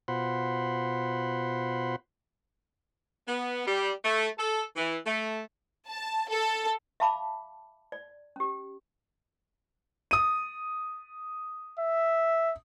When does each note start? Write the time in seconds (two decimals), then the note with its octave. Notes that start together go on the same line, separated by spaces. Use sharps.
0.08 B2 F4 C5 F#5 B5 C6
3.27 B3
3.66 G3
4.04 A3
4.38 A4
4.76 E3
5.06 A3
5.88 A5
6.28 A4
7.00 E5 F5 A5 B5 D6
7.92 D5
8.36 C#4 G4
10.11 D#6 D#7
11.79 E5